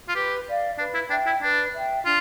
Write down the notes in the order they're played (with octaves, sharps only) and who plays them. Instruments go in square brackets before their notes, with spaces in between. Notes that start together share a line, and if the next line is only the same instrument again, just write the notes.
[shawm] F4
[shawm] G4 [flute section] B4
[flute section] D5 F5
[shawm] D4 [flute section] B4
[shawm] E4
[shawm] D4 [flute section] E5 G5
[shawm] E4
[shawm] D4 [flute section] B4
[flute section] E5 G5
[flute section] D4 [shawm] F4